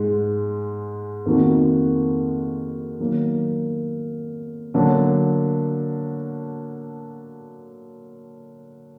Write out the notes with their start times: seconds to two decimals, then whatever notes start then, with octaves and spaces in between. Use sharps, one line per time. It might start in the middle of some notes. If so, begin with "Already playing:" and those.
Already playing: G#2 G#3
1.26 F2 D#3 A#3 D#4 F#4
3.00 D#3 F#3 A#3
4.74 D3 F#3 A#3 D4